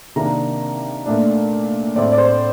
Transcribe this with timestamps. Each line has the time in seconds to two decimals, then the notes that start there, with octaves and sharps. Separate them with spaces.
0.16 C3 D#3 A#3 D4 A#5
1.06 A#2 A3 D4
1.96 A2 A3 C4 D5
2.12 D5
2.18 C5